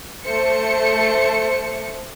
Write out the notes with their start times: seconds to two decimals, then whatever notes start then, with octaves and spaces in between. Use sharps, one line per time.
0.24 A3 C5 C#7